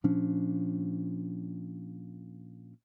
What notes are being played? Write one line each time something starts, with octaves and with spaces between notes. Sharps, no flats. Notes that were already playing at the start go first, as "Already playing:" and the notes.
A#2 F3 C#4 D4